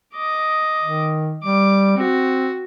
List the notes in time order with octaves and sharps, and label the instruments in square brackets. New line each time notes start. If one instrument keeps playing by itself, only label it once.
[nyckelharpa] D#5 D6
[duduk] D#3
[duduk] G3 [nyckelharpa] D6
[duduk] C4 [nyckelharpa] F#4